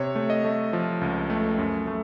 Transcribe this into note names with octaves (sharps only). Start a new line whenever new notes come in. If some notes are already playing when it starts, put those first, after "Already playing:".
Already playing: C3 C#5
A3
D#5
A3
F3
C#2
A3
F#2
A3